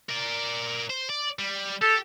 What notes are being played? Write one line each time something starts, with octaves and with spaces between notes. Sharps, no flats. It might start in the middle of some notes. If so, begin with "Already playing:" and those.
A#4 D5
C5
D5
G3
G4 A4